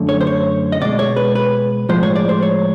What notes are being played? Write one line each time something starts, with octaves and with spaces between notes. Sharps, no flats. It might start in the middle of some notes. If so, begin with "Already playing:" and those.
Already playing: F#2 D3 A3
C#5
C5
C#5
D#5
B2 G#3 D5
C#5
B4
B4
A2 F3 G#3 C5
C#5
D5
C5
C#5